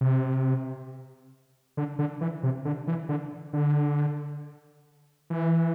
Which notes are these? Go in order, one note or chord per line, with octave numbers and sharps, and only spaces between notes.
C3
D3
D3
E3
C3
D3
E3
D3
D3
E3